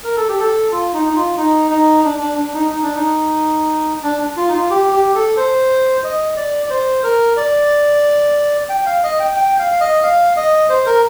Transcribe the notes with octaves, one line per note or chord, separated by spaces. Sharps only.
A#4
A4
G4
A4
F4
D#4
D#4
F4
D#4
D#4
D4
D4
D4
D#4
D#4
D4
D#4
D4
F4
D#4
F4
G4
G4
A4
C5
D#5
D5
D5
C5
A#4
D5
G5
F5
D#5
G5
G5
F5
F5
D#5
F5
D#5
C5
A#4